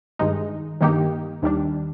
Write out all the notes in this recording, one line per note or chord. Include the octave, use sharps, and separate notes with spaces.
G2 D#3 G#3 D#4
G2 D#3 A#3 D#4 G4
D#2 D#3 G3 D4